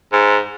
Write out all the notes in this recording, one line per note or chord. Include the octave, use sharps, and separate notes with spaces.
G#2